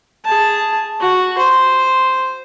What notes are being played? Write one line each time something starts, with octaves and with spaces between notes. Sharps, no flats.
G#4 A5
F#4
C5